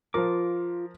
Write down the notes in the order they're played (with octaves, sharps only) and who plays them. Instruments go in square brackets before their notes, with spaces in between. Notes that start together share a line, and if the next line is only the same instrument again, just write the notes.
[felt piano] F3 A#4 [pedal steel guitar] F4 D6